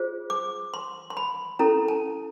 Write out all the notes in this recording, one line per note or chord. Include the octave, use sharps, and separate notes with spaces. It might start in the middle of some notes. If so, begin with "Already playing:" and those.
Already playing: F4 G#4 C5
D6
C6
C6
B5
C#4 E4 A4 A#5
A5